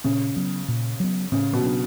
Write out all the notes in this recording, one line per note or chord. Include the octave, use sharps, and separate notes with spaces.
A#2 C#3
F#3 B3
A#2
F#3 B3
A2 C#3
B2
F#3 B3 D4